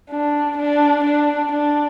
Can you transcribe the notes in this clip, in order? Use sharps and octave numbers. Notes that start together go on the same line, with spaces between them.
D4
D4
D4
D4